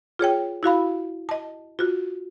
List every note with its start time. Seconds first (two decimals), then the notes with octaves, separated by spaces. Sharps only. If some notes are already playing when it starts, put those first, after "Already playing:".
0.19 F4 G#4 C#5 G5
0.63 E4 F#4 F5 B5
1.29 D#5 A5
1.79 F4 F#4